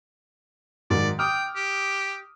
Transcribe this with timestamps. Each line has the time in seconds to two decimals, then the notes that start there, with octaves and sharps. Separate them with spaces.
0.90 G#2 D#3 F#3 D5
1.19 G5 D6 D#6 F6
1.56 G4